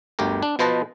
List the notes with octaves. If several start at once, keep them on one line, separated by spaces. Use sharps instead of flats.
G1 D2 G4 A#4
D4
B2 F3 B4 C5 D#5 A5